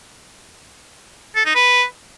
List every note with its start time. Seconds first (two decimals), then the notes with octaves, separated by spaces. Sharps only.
1.36 A4
1.46 D#4
1.55 B4